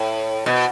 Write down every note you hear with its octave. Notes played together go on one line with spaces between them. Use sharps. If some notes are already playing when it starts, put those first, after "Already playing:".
Already playing: A2
B2